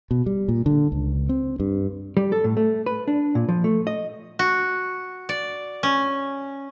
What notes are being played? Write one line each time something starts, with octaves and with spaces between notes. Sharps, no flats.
B2
G3
A#2
D3
C#2
C4
G2
G3
A4
A2
A3
B4
D4
A#2
F3
A3
D#5
F#4
D5
C#4